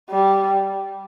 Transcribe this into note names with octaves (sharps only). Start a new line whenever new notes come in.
G3